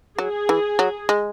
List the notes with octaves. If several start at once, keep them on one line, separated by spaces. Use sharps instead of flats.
F#3 G#4
E3
F#3
G#3